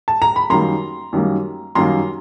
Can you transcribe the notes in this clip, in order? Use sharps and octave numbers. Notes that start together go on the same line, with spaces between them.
A5
A#5
B5
F#2 D#3 G3 A#3 A#5 C6
F#2 D#3 G3 A#3
F#2 D#3 G3 A#3 A#5 C6